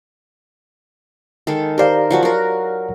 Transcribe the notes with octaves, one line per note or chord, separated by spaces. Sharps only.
D#3 G#3 A4
G4 A#4 C5 D5 F5
F3 F#3 F#4
F#4 A#4